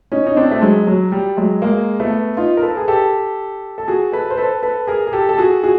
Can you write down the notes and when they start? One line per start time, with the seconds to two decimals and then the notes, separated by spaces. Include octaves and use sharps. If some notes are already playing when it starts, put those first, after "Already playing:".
0.12 C#4 D#4
0.27 D#4
0.37 C4 D4
0.51 A3
0.61 F#3 G#3
0.87 F#3
1.12 G3
1.37 F#3 G#3
1.62 G#3 A#3
2.00 A3 B3
2.37 D#4 F4
2.57 A#4
2.62 A4 B4
2.77 G#4
2.88 G4 A4
3.78 A4
3.88 F#4 G#4
4.12 A4 B4
4.30 C5
4.37 A4 B4
4.63 A4 B4
4.87 G#4 A#4
5.07 G#4
5.13 G4 A4
5.29 A4
5.38 F#4 G#4
5.63 F#4 G#4